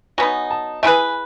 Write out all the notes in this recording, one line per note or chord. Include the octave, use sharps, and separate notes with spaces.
F#3 B3 D#4 G#5
A5
A3 E4 G#4 B4 G#5